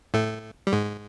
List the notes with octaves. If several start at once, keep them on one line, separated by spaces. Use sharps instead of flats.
A2 A3
G3
G#2 G#3